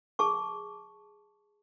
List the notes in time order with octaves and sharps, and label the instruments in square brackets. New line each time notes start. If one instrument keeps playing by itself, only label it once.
[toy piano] G#4 A5 C#6